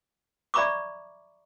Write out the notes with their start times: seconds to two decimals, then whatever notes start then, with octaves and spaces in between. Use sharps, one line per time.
0.54 D5 E5 A#5 B5 C#6 D6